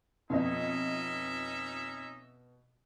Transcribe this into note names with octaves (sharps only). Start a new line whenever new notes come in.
F2 B2 C#4 D#4 D#5 E5